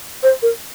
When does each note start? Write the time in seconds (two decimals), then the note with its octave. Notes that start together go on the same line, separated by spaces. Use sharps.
0.23 C5
0.42 A#4